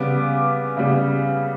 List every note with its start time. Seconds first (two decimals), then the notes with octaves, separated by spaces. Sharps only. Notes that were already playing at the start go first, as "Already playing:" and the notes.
Already playing: C#3 G3 B3 D6
0.77 C#3 G3 B3